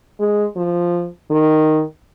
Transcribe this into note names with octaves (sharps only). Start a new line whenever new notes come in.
G#3
F3
D#3